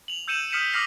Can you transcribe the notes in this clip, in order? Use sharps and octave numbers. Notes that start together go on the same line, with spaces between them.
F7 F#7
E6 G6 C#7 D#7 E7 F#7
D#6 F6 B6 C#7 D#7 E7
D6 D#6 F6 A#6 C7 F#7